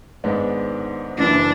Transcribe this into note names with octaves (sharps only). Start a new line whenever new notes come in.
G#1 G#2 G#3 B3 D4
F#1 F#2 E3 D4